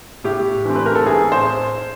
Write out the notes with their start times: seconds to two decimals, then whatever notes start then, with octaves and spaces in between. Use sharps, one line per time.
0.24 A2 G4
0.65 E3 A3 C4
0.76 B4
0.86 A#4
0.95 A4
1.05 A2 G#4
1.32 C5